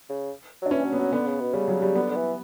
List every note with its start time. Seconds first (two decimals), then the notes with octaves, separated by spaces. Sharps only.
0.09 C#3
0.62 F#3 D4
0.71 E3 C#4
0.85 F#3
0.93 B3
0.99 F#3
1.12 D3 B3
1.26 C#3
1.40 B2
1.53 C#3 G3
1.68 F#3
1.82 G3
1.95 D3 B3
2.10 D3
2.16 E3